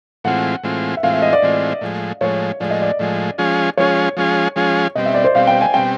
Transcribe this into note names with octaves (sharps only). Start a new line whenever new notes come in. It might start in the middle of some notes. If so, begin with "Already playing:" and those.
A2 E3 G#3 C4 F4 F#5
A2 E3 G#3 C4 F4
E5
A2 E3 G#3 C4 F4 F5
E5
D#5
D5
A2 E3 G#3 C4 F4
A2 F3 G#3
A2 F3 G#3 C#5
A2 F3 G#3 D5
D#5
D5
A2 F3 G#3
F3 G#3 C#4 F4 G#4
F3 G#3 C#4 F4 G#4 C#5
F3 G#3 C#4 F4 G#4
F3 G#3 C#4 F4 G#4
B2 G3 C4 D#5
E5
D5
C5
B2 G3 C4 F5
G5
G#5
B2 G3 C4 G5